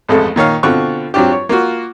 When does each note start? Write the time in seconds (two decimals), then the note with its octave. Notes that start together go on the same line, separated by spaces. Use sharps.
0.09 A1 F2 G#3 A3 A4
0.36 A#2 D#3 C#5 F5
0.63 B2 D3 C4 F4 C#6 F#6
1.14 F#3 C4 D4 F4 G4
1.32 C#5
1.49 A#3 F4 F#4